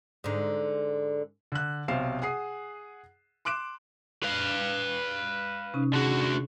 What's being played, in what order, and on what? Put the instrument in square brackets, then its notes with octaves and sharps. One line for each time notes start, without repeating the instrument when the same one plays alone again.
[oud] G#2 D3
[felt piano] D3 F#6
B1 C3 C5 F5 C7 E7
G#4 F#5 D#6 C7
C6 D6 F#6 D7 E7
[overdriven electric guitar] B4 F5
[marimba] C3 C#4 D#4
[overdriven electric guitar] D3 F#4 [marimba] G#4